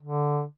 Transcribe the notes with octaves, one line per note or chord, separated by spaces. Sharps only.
D3